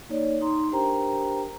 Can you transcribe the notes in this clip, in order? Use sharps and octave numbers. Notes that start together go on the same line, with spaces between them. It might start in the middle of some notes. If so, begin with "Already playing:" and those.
A#3 D#4 C#5 D5
D#4 A#5 C6
D4 G4 A#4 C5 G5 A#5